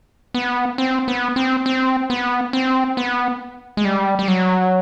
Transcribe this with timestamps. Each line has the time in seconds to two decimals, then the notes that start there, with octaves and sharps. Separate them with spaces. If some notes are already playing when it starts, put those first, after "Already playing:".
0.34 B3
0.78 C4
1.08 B3
1.36 C4
1.66 C4
2.10 B3
2.53 C4
2.97 B3
3.77 G#3
3.85 G3
4.19 G3
4.28 F#3